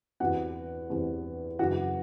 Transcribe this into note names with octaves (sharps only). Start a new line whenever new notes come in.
E2 C3 E3 F#4 F#5
E2 C3 E3
F#2 C#3 E3 F#4 F#5